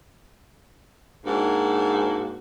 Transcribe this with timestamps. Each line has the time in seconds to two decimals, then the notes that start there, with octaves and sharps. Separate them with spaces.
1.25 G#2 A#3 D4 F#4